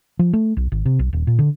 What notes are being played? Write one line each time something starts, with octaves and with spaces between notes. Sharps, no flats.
F3
A3
B1
G#1
C3
B1
D#1
A#2
D3